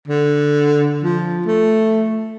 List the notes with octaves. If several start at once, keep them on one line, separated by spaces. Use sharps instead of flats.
D3
F3
A3